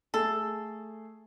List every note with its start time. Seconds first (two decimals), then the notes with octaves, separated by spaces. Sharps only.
0.14 A3 G#4 A4